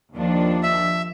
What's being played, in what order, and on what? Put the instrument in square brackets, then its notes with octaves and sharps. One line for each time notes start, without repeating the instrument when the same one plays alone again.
[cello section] D#2 F3 D4
[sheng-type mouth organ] E5